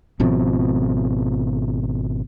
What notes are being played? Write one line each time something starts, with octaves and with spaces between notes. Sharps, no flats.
G#1 B2 F3 C4